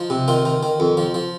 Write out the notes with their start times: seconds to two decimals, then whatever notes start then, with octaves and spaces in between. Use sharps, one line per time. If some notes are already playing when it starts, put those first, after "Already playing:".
Already playing: F3 D#4
0.10 C3
0.28 D#3 F4
0.45 D#3
0.63 D#3
0.80 F2
0.97 F3
1.14 F3